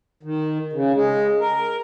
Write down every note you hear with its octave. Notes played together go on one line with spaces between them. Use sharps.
D#3
C#3
G#3
A#4